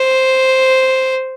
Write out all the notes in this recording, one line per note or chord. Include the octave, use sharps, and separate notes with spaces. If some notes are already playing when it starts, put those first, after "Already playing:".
Already playing: C5